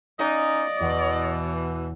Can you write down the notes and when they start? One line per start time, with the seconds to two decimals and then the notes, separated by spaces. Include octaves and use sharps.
0.19 C#4 D#4 D5 D#5 F5 F#6
0.80 E2 B2 E3 F#5 C#6